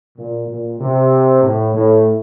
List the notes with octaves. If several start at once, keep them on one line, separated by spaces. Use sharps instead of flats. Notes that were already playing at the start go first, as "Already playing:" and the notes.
A#2
A#2
C3
A2
A2